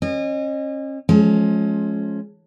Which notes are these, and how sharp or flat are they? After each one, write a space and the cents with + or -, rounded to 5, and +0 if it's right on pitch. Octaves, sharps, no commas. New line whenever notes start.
C#4 -35 D#5 -30
F3 +10 G#3 +35 C#4 +0